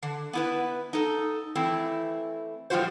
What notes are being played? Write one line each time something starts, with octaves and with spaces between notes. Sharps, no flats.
D3
B3 E4 B4
D#4 A4
E3 A3 C4 E4
A2 F3 G3 F4 F#4 C5